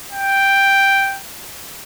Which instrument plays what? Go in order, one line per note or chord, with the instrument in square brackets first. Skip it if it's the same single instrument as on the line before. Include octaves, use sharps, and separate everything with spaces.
[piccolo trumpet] G5